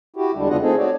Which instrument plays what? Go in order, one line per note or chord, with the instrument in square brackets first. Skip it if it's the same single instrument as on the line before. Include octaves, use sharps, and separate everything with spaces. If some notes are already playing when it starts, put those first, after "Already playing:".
[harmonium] E4 F#4 G4
E2 D3 G3 G#3 D4
C#3 B3 D4 F4 D#5 F#5
A3 C4 D#4 G#4 A4
F#4 C#5 D5